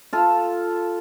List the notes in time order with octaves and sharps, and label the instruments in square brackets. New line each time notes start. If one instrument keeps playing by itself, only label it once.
[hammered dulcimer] F4 A4